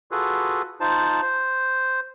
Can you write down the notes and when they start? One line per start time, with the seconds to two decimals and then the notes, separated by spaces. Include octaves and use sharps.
0.11 F4 F#4 G#4 A4 B4
0.80 D#4 F4 C5 A5
1.22 C5